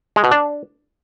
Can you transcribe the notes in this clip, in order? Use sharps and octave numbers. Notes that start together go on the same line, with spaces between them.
G#3
B2
D4